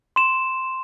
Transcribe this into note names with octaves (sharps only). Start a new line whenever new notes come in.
C6 E7